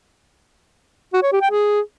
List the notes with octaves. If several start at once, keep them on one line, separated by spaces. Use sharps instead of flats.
F#4
C#5
G4
G5
G#4